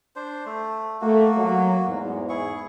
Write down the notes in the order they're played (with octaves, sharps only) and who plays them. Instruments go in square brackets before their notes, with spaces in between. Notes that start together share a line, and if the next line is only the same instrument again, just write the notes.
[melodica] D4 C5
A3
[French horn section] A3 [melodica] A#3 F#4
[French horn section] F#3
E2 G#2
[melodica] E4 G#4 C#6